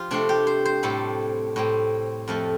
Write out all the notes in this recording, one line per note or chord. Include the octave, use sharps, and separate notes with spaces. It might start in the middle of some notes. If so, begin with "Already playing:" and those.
Already playing: F3 F4 G4
C3 A3 C4 D4
G4
C5
C5
A2 G3 C4 A4
A2 G3 C4
F2 F3 A3